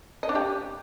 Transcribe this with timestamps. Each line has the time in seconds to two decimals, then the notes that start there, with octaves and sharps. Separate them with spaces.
0.23 D#5
0.29 D4
0.35 G4